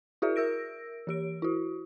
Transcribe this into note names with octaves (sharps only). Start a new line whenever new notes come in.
E4 F#4 G#4 A#4 E5
A#4 E6 A#6 D7
E3 G4 D7
E4 F#4